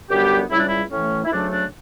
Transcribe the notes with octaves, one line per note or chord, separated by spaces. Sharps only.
F#2 D3 G3 B3 G4
C#2 C#3 G3 E4
D4
E4
A2 E3 A3 C#4
E4
D2 C#3 F#3 A3 D4
D4